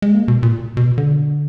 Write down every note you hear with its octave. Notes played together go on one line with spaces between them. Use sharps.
G#3
A#3
B2
A#2
B2
D3